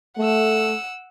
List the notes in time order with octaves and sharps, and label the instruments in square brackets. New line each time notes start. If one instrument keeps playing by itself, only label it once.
[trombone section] A3 [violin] F#5 E6